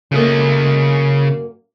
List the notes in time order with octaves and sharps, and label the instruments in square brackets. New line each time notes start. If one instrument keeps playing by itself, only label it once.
[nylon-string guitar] F#2 A3 A#3 [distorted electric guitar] C#3 D#5